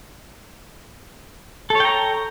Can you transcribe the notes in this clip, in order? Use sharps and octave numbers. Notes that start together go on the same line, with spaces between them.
A4 C#5 G5 A#5